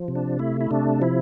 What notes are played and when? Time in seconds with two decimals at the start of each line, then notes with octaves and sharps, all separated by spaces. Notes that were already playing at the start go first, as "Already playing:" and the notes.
Already playing: F3
0.08 C3
0.15 D4
0.39 A3 E4
0.61 E4
0.71 C3 D4
1.01 F3 E4